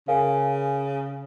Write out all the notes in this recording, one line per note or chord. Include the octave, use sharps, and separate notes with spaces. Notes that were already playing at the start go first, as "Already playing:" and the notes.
C#3 A#4 F5 G#5